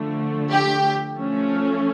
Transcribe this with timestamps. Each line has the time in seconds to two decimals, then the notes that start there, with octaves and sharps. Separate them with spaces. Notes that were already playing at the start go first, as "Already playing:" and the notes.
Already playing: D3 F3 A3
0.51 G4
1.15 F3 A3 C#4